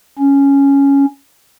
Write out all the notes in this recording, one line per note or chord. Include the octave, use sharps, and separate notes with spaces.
C#4